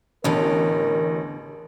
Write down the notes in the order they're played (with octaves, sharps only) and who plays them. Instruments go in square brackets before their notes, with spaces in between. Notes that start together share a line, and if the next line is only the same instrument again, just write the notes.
[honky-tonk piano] A1 [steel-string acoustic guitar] E2 D3 [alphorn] A#4